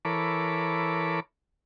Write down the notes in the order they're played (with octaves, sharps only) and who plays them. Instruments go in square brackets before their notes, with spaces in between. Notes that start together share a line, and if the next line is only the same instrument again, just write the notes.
[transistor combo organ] E3 A4 A#4 C#5 B5 D6